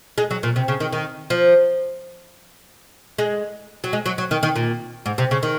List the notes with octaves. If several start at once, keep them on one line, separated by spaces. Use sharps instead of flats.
G#3
F#3
A#2
C3
C#3
D#3
D#3
F3
G#3
F#3
G#3
F#3
F#3
D#3
D#3
A#2
G#2
C3
C#3
D#3